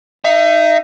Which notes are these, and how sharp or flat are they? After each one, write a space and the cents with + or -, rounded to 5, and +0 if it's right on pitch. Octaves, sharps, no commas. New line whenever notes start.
D#4 +0 E5 +35